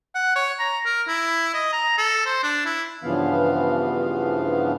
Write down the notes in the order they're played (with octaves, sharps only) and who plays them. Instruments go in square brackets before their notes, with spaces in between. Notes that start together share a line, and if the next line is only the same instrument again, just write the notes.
[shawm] F#5
C#5
A#5
A#4
E4
D#5
A#5
A4
C5
D4
E4
[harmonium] G2 C#3 E3 F3 B3 F5